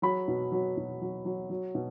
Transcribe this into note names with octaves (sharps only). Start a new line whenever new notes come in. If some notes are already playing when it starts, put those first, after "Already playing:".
F#3 B5
B2
F#3
B2
F#3
F#3
F#3
B2